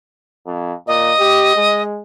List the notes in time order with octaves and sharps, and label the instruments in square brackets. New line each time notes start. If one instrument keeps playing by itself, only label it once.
[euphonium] F2
[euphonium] A#2 [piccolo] D#5
[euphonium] G4
G#3